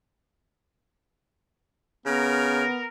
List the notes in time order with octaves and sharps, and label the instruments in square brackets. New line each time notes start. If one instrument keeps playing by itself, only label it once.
[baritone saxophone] C#3 [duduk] B3 [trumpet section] A#4